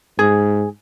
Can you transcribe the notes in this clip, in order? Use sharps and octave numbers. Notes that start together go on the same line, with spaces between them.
G#2 G#4